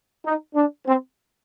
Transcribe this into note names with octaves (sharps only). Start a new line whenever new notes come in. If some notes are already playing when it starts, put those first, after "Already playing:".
D#4
D4
C4